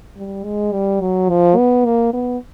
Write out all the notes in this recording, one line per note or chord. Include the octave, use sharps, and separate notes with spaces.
G3
G#3
G3
F#3
F3
B3
A#3
B3